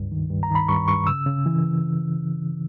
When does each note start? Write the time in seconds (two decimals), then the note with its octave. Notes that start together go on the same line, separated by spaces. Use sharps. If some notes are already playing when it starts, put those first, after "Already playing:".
Already playing: C#2 G2
0.12 D#3
0.30 G2
0.43 A#5
0.50 D#3 B5
0.68 G2 C#6
0.88 G2 C#6
1.07 C#3 E6
1.26 C#3
1.46 E3